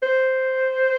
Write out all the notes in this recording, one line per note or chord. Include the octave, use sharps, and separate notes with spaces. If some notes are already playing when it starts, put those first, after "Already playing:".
C5